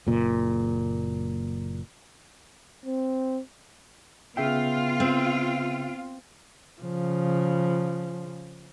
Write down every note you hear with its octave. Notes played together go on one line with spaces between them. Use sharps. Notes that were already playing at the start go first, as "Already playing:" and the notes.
F#1 A#2
C4
C#3 B3 F4 E5 G5
C4
C#3 F3